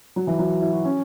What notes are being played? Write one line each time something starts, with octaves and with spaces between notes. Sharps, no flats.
F#3
E3
F#3
E4
F#4
C#4